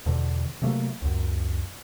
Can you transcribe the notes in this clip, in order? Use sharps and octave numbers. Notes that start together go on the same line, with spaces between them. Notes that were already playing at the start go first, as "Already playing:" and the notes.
E2 B2 D3
C3 F#3 A3 A#3
C#2 F#2